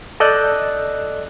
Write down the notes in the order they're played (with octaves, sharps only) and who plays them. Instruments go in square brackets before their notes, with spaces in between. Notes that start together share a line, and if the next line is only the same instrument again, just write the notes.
[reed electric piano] A4 D5 D#5 E6 F#6 G6